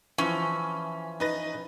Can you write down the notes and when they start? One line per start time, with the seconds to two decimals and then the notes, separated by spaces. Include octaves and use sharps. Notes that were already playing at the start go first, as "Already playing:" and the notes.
0.18 E3 F3 C#4
1.20 D#4 B4 A#6